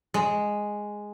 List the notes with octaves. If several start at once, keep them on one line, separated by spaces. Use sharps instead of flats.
G#3